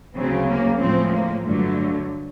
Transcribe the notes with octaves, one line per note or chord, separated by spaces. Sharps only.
D2 C#3 F#3 C4
A#3
A2 F3 G#3 C4
A#3
G2 D3 F#3 A3